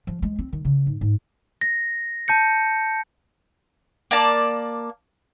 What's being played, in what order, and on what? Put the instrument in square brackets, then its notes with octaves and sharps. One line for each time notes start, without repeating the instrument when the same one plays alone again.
[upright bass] F3
G#3
C4
D#3
C#3
G#2
G#2
[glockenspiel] A#6
A5 G6 C#7
[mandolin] A#3 D5 A5